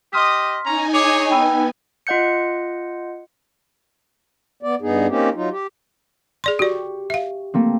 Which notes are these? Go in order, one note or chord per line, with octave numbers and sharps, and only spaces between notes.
G4 D#5 C6 D#6 F6 B6
C#4 D#4 G#5 A#5
G#4 C#5 D6
B3 G5 B5 E6
F4 D#5 F#5 G6 C#7
B3 D5
G2 B3 D#4 G#4
A#3 C4 C#4 D#4 G4
F#3 D#4 F4
G4
G#4 D5 C6
F#4 G4 D5 C#6
E5 F5
A3 A#3 C4